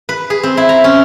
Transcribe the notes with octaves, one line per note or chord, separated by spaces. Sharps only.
B4
G#4
C4
E4
A#5
C#4